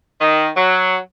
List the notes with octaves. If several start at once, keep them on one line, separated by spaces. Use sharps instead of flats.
D#3
F#3